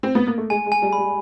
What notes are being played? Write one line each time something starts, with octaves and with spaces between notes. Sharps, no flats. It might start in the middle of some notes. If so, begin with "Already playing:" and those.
C4
B3
A#3
A3
G#3 G#5
G#3
G#5
G3
B5
G3